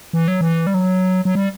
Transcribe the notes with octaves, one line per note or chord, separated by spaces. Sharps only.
E3
F#3
E3
G3
F#3
F#3
G3